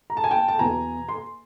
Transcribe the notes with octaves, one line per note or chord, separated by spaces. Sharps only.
A#5
A5
G#5
G5 A5
A5
E2 B2 F#3 G#5 A#5
C6